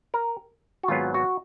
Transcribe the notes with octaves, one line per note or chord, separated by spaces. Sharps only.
A#4
F#4
G#1 G#2 F#3 B3 F4
F#4